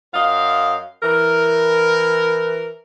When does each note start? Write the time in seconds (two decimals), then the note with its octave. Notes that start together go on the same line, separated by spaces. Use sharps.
0.14 F#2 D#5 F5
1.03 E3 A#4